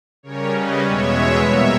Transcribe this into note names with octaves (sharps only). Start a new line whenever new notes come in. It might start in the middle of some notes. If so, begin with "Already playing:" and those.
C#3 G3 C#4 A#4 C#5
B4 D#5
E2 B2 G#3 B3 C#5 E5
A#2 G3 A#3 C#5 E5